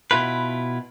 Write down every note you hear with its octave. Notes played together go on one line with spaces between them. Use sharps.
B2 E4 F4 B4